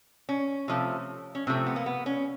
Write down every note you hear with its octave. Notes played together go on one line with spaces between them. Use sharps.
C#4
C3 F3 A3
C#4
C3 F3 A3 C4
B3
A#3
B3
C#4